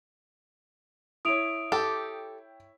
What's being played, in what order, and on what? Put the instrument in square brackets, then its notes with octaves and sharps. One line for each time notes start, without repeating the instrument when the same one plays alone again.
[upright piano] E4 C#5 [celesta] D#6 D7 F7
[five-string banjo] G4 A4 [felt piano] G5